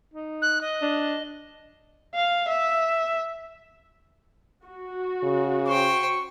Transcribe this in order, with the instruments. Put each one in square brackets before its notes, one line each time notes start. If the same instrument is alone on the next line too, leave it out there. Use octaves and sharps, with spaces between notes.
[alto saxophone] D#4
[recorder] F#6
D#5
[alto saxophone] D4
[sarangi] F5
E5
[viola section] F#4
[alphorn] C#3
[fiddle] C5 G5 [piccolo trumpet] C#6